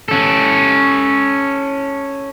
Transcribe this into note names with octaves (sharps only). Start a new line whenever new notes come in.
C#4 A4